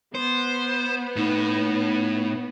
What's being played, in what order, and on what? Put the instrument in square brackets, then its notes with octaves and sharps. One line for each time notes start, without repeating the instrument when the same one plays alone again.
[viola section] B3 [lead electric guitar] C5
[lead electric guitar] A2 [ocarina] D#4